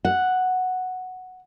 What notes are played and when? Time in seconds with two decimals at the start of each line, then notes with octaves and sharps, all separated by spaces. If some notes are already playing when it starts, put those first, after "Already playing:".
0.05 F#5